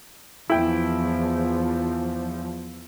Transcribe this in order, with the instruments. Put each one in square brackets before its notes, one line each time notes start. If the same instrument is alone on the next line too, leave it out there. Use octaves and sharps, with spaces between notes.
[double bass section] E2 F3 [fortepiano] E4 G5